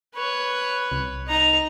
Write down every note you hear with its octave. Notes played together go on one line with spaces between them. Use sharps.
B4 C#5
C2
D#4 A#5